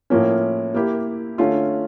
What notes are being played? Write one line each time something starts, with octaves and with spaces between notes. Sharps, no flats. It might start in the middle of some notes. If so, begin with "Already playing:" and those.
A2 F3 A#3 C#4
A#3 E4 G4
D3 A3 C#4 F4